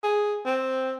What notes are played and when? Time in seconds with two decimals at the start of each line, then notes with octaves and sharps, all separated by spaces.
0.04 G#4
0.46 C4